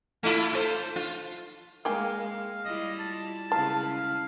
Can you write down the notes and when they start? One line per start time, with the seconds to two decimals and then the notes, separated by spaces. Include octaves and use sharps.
0.23 A3 E4 F4
0.53 F4 A4 C5
0.96 F4
1.85 G#3 A#3 F5 G5 G#5
2.21 F5
2.65 G3 E4 F4 D#5
2.99 A5
3.52 C#3 G#3 E4 F5 A5